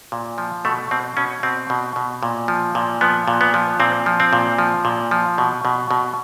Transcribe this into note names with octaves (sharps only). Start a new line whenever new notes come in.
A#2
F3
B2 A3
B2 C4
B2 C#4
B2 C4
B2
B2
A#2
F3
A#2
F3 B3
A#2
B3
F3
A#2 C4
F3
C4
A#2
F3
A#2
F3
B2
B2
B2